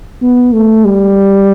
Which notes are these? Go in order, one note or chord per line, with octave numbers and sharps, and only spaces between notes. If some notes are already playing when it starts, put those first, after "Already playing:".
B3
A3
G3